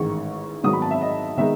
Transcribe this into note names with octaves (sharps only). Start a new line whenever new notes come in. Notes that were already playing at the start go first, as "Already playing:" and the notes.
Already playing: A1 G#2 D#3 G#3 C#6
G#1 G#2 D#3 F#3 B3 D#6
B5
A5
E5
D#5
D#3 G#3 B3 D#4 E5